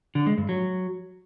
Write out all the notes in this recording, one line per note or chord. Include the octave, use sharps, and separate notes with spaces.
D3
G#3
G2
F#3